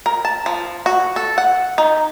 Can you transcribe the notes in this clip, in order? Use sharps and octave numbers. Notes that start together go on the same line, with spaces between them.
A#4
A5
F3
F#4
A4
F#5
D#4